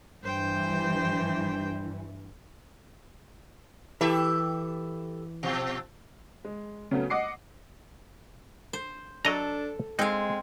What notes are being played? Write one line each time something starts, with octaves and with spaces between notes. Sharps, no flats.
G2 E3 C5 G5
E3 G4 A4 E5
B2 F3
G#3
C#3 F#3 A3 B3 C#4
D#5 F#5 D6 C7 C#7
C5
F#3 D4 A4 D#5 A#5
G#3 C4 D#4 F5